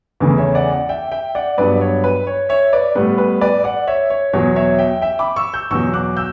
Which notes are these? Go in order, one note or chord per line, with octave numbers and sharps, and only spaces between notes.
E2 C#3 E3 A3 B4
C#5 E5
D5 F#5
D5 F#5
E5 G5
E5 G5
D5 F#5
G2 F#3 B3 B4 D5
C#5
B4
C#5
C#5 E5
B4 D5
A2 G3 B3 B4
B4
B4 D5
D5 F#5
C#5 E5
C#5
E2 B2 F#3 C#5
C#5 E5
E5 G5
E5 G5
B5 D6
C#6 E6
E6 G6
E2 B2 F#3 C#6 E6
D6 F#6
E6 G6